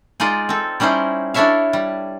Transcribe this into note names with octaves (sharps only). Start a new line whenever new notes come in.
G#3 D#4 F4 D5 D#5
C4 A4
G3 C#4 D#4 E4 C5
D4 E4 A4 C#5 E5 F5
G3